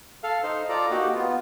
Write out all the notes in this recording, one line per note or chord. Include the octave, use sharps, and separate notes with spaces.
A4 F5
D#4 C5
F4 A4 D5 A#5
A#3 D#4 F#4 G4
B3 F4